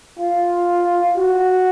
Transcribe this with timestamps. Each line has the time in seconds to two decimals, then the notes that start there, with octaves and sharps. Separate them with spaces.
0.19 F4
1.17 F#4